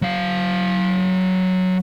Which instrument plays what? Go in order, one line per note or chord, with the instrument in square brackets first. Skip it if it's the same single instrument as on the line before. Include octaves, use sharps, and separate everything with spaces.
[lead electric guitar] F#3 F5